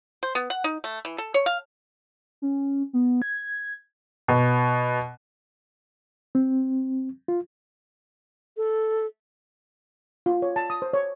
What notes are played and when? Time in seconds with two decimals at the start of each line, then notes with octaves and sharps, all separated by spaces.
0.23 C5
0.35 B3
0.50 F#5
0.64 D#4
0.84 A3
1.05 E3
1.18 A4
1.34 C#5
1.46 F5
2.42 C#4
2.93 B3
3.22 G#6
4.28 B2
6.35 C4
7.28 F4
8.57 A4
10.26 F4
10.42 C#5
10.56 A5
10.70 D#6
10.82 C5
10.93 C#5